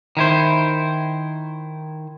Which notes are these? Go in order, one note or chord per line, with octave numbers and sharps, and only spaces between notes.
D#3 E4 C5